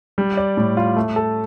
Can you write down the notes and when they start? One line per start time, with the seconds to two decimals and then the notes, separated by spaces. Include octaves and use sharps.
0.18 G3
0.37 D5
0.57 A2
0.77 F4
0.96 A3
1.16 A4